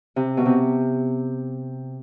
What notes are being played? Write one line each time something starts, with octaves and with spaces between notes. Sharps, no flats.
C3
B2
C3